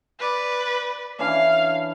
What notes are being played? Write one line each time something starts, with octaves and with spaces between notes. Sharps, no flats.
B4 D5
E3 C#4 D4 F5